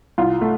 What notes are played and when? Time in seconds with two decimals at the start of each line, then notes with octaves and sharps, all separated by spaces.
0.18 C2 F4
0.41 A3